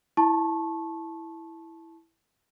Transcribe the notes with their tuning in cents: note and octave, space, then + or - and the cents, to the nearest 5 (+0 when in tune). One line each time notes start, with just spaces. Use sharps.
E4 +0 A5 -15 C#6 -25